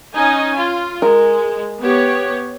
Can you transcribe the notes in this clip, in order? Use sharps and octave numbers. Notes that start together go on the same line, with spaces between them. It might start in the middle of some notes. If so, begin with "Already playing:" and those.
C#4 D#4 G#5
F4
G#3 A#4
B3 G4 C#5